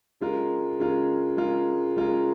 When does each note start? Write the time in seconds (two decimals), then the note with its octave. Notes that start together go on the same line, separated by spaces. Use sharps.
0.21 C#3 G#3 F4 A#4
0.79 C#3 G#3 F4 A#4
1.37 C#3 G#3 F4 A#4
1.96 C#3 G#3 F4 A#4